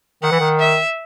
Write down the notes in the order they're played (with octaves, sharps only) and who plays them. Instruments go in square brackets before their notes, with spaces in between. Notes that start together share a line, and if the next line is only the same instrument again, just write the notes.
[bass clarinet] D#3 [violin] F#5
[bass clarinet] E3
D#3
[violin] E5